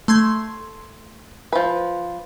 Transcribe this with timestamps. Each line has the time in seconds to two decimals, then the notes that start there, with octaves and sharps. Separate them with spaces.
0.08 A3 C6 G#6
1.53 F3 B4